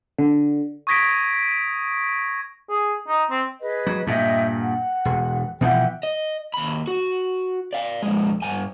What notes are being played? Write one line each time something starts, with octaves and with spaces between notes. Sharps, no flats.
D3
C#6 D#6 G#6 A#6 B6 D7
G#4
D#4
C4
G#4 B4 D#5
F#3
G2 A#2 D#5 E5 G5
F#5
E1
B2 E3 F3 E5 F#5 G5
D#5
D#2 B5
F#4
D5 F5
F2 G#3
G2 G#5